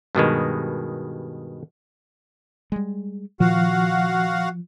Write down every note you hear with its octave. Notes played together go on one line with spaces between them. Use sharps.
G2 B2 D#3 G#3
G3 G#3
A#2 D#3 F3 F#4 F5 F#5